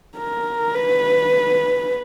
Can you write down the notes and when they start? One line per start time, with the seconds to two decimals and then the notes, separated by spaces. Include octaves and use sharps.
0.17 A#4
0.75 B4